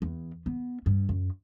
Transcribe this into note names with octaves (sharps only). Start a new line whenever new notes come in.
E2
B3
G2
F#2